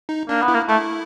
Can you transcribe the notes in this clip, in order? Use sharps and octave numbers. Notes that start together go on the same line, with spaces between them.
D#4
A#3 D4
B3
E4
A#3
A3 E4